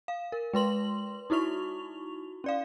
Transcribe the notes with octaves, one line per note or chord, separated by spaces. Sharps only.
F5
A#4
G#3 B4 C6 F#7
D#4 E4 F#4 C#6 F7
C#4 D5 F5